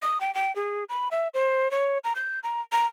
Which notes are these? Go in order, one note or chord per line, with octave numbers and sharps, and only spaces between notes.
D#6
G5
G5
G#4
B5
E5
C5
C#5
A#5
G6
A#5
A#5